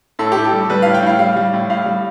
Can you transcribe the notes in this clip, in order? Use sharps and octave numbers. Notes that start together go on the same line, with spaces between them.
A2 A4
A2 G4
A4
G3
G3 B4
A2 F5
G5
A2 F5
G3 F5
G3
A2
A2 F5
G3